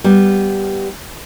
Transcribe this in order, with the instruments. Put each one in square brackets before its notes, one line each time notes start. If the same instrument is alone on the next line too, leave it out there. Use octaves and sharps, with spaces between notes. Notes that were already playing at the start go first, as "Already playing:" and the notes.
[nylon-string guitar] G3 B3